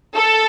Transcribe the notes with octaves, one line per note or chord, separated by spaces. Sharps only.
A4